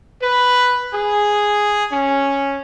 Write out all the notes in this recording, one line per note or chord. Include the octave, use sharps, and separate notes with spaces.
B4
G#4
C#4